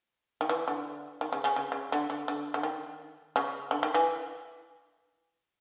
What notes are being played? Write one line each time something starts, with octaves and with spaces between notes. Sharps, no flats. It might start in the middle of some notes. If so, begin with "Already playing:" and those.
D#3
E3
D3
D#3
C#3
C#3
C#3
C#3
D3
D3
D3
D3
D#3
C#3
D3
D#3
E3